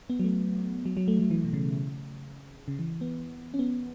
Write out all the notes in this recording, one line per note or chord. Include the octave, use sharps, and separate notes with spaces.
B3
F#3
A3
F#3
F#3
A3
F#3
E3
B2
C#3
C#3
E3
B3
C#4
B3